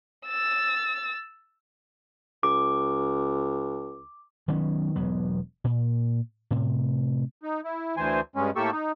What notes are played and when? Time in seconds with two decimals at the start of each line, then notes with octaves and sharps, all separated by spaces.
0.27 E6 A6
2.43 C#2 D6
4.48 D#3 F#3 B3 C#4
4.96 E1 F#3 B3
5.64 A#2
6.51 A2 C3
7.43 D#4
7.64 E4
7.97 D2 E3 C5 G#5
8.36 G2 G#3 C#4
8.56 A2 A#3 G4 A4 C#6 E6
8.72 D#4